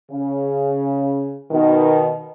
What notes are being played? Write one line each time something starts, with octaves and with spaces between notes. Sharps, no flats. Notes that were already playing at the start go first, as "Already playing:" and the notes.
C#3
B2 D#3